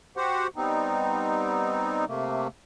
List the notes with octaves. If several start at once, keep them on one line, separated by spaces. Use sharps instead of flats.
F#4 G4 C5 F#5
G3 B3 C4 D#4
C3 A3 A#3